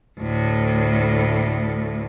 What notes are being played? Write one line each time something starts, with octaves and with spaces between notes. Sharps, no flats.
D2 A2